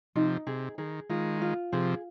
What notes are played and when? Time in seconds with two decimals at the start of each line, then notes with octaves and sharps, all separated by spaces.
0.16 C3 F3 D#4
0.47 C3 G#4
0.78 D#3 G#4
1.10 D#3 G#3 F4
1.42 F4
1.72 C3 F3 G#4